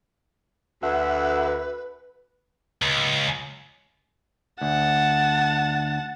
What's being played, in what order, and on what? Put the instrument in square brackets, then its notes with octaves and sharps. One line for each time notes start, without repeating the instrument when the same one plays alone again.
[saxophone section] D2 [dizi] B4 [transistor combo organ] E5 F#5
[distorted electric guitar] C#2
[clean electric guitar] D2 [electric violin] F#5 A5